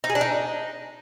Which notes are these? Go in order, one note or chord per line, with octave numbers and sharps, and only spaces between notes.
D#4
G#4
D4
D#4